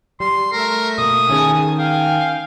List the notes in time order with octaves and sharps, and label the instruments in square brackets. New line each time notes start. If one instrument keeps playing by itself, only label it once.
[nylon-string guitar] G3 [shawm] C6
[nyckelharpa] A3 E5 [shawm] A#4
[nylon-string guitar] B2 A#3 [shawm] D#6
[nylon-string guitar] D#3 C#4 G#4 [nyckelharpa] G#5 A5
[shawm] F5 [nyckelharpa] G5 G#5